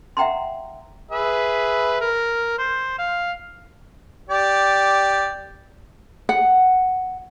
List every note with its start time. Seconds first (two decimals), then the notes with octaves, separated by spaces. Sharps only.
0.17 E5 F#5 G5 A#5 C6
1.11 G#4 B4 E5
2.01 A#4
2.59 C5
2.98 F5
4.29 G4 D5
6.29 F#5